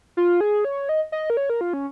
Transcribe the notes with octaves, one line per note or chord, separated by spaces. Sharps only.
F4
G#4
C#5
D#5
D#5
A#4
C#5
A#4
F4
C#4